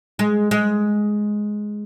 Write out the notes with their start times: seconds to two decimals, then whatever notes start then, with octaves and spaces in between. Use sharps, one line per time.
0.19 G#3
0.51 G#3